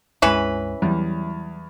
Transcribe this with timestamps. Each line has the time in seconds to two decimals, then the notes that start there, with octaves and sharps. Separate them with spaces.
0.22 C#2 G2 E3 G#3 C#4 B4
0.82 E2 F#3 G3